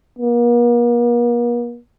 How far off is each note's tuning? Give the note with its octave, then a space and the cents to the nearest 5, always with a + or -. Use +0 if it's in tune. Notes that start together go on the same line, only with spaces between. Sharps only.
A#3 +45